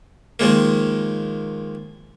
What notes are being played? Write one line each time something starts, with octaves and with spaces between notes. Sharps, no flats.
D#3 F3 G#3 A#3